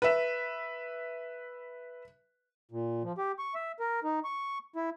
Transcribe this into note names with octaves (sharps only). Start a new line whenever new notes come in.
B4 E5
A#2
F3
G4
C#6
E5
A#4
D#4
C#6
E4